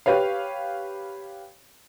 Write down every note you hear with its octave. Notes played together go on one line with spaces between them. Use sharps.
G4 B4 C#5 F5